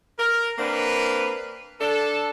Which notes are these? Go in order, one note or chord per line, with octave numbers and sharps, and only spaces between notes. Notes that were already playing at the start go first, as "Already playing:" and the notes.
A#4
A#3 C4 D4 A#4 B4
D4 A4